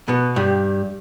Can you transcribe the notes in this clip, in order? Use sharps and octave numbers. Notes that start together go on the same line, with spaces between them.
B2 B3
G2 G3